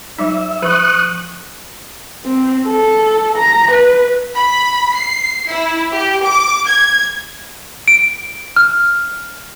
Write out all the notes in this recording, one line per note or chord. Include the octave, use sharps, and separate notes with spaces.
F#3 G3 D#4 E5
F3 C#6 D#6 F#6
C4
A4
A#5
B4
B5
C7
E4
G4
D6
G#6
D7
F6